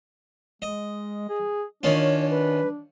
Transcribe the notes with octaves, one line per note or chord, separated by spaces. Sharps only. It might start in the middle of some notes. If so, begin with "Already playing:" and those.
G#3 D#5
G#4
D#3 C#4 D4 F4 C#5
B4